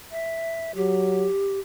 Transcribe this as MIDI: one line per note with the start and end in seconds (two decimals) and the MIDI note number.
0.11 0.74 76
0.75 1.28 54
0.75 1.59 67